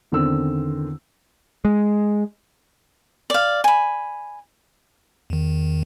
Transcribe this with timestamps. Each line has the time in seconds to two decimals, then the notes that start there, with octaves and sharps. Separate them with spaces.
0.12 E2 D3 D#3 C4 E6
1.65 G#3
3.30 D5 F5
3.64 G#5 B5
5.30 E2 D#3